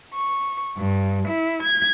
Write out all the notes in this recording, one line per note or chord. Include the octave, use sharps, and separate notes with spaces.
C#6
G2
E4
G#6